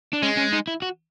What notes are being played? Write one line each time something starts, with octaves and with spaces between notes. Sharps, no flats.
D4
G#3 C#4
C#4
D#4
E4
F#4